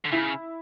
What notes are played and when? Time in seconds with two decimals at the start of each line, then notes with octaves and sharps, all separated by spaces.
0.05 D3
0.11 C#3 E4